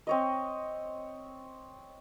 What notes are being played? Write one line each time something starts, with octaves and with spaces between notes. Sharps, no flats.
C4 C#5 D#5